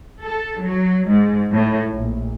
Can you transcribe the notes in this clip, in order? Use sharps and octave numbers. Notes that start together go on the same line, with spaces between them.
A4
F#3
G#2
A2
A#1